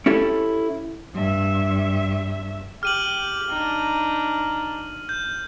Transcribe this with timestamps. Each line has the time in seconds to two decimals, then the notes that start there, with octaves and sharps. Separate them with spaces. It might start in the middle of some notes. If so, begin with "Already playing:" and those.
0.06 C#4 E4 G4 A4
1.14 G2 E5
2.83 G4 F6 D#7 F#7
3.50 D4 D#4
5.09 G6